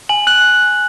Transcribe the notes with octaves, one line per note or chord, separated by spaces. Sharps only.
G#5 F#7
F#6 F#7